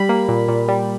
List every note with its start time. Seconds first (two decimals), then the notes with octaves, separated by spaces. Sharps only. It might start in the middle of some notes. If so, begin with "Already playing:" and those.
Already playing: G3 B5
0.09 A#3
0.28 A#2
0.48 A#2
0.68 G3